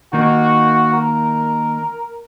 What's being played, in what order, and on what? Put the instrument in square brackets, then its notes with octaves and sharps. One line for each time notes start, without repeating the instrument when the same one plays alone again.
[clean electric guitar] D#3 A#3 D#4 [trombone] F#4
[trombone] A#4